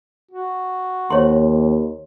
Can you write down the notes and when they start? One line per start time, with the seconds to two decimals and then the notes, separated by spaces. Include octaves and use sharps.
0.31 F#4
1.10 D#2 C5 C#5 C6